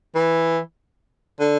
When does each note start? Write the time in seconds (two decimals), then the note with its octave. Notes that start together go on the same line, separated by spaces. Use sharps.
0.15 E3
1.40 D3